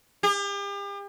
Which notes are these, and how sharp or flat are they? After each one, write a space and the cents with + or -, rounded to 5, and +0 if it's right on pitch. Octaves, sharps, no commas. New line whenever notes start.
G4 +40